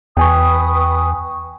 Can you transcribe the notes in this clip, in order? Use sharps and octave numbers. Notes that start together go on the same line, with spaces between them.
E2 B4 G5 G#5 C#6 D#6